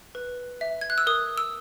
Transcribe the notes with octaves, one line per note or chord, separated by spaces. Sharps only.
B4
E5
G#6
F#6
E6
A#4 D#6
E6